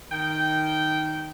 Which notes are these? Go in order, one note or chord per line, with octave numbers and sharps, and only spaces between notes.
D#3 G5